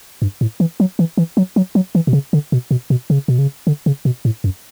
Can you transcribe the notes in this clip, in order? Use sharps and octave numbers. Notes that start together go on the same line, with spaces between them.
G2
A2
E3
F#3
E3
E3
F#3
F#3
F#3
E3
B2
C#3
D3
B2
B2
B2
C#3
B2
C#3
D3
C#3
B2
A2
F#2